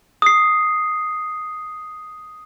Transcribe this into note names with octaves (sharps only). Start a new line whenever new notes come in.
D#6 C7